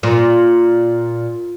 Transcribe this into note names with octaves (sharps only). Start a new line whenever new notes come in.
A#2